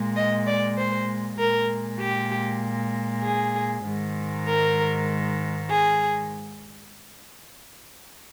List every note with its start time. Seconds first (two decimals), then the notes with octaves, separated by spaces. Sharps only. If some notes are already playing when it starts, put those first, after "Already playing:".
Already playing: A#2 G#3
0.16 D#5
0.46 D5
0.77 C5
1.38 A#2 G#3 A#4
2.00 G4
3.22 G#4
3.84 G#2 D#3 G#3
4.46 A#4
5.69 G#4